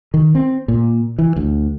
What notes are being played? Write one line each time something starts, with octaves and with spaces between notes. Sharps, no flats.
D#3
C4
A#2
E3
D2